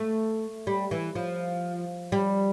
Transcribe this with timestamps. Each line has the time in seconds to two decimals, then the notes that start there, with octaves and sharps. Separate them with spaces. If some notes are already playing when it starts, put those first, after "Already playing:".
Already playing: A3
0.67 G3
0.91 E3
1.15 F3
2.12 G3